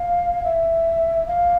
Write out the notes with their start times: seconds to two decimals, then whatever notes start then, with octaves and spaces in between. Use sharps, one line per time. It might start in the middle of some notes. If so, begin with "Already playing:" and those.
Already playing: F5
0.44 E5
1.26 F5